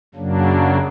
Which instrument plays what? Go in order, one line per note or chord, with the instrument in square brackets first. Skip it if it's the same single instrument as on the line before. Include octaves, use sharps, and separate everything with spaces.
[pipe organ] F#2 C#3 F#3 A#3 D4